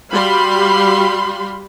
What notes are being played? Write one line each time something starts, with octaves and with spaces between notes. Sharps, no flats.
G3 F#4 G4 F5 B5 C6